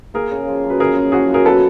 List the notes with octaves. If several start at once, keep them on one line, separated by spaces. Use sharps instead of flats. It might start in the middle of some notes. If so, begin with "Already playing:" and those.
A#3 G#4 A#4
C#3
F3
F#2
B4
A#3 G#4 A#4
C#3
F3 F#4 G#4
F#2
G#4 A#4
B2 A4 B4